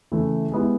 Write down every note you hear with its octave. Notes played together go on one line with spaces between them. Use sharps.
C#3 E3 A3
G#3 B3 E4 G4